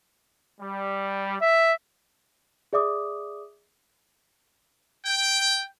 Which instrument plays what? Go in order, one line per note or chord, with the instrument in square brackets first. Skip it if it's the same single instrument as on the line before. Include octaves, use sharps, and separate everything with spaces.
[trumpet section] G3
E5
[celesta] G#4 D5 E5 D6 D#6
[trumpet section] G5